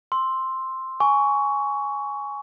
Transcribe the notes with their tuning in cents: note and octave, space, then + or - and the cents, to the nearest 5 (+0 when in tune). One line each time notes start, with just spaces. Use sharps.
C6 +0 E6 +0
G#5 +0 C#6 +20